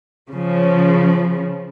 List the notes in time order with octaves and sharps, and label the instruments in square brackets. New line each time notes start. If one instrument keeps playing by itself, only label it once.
[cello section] C#3 F3